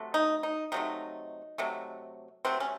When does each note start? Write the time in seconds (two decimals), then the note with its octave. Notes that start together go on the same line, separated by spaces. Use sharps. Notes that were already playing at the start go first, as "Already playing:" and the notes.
Already playing: C3 F#3 A3
0.14 D#4
0.43 D#4
0.72 C3 F#3 A3 D#4
1.58 C3 F#3 A3
2.45 C3 F#3 A3 C4
2.60 C#4